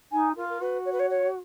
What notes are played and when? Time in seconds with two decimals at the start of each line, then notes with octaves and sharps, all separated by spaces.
0.11 D#4 G#5
0.36 F4 A#4
0.49 A#4
0.61 F#4 B4
0.85 C#5
0.92 B4
0.99 C#5
1.10 C#5